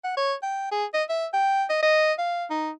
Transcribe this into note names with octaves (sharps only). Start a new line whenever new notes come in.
F#5
C#5
G5
G#4
D#5
E5
G5
D#5
D#5
F5
D#4